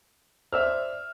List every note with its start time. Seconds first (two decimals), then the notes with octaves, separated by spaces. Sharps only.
0.52 C5 D5 E5 E6 F6